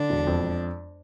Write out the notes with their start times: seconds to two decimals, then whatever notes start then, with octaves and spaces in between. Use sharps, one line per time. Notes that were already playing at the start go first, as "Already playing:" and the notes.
Already playing: D3 D4
0.10 E1
0.27 F2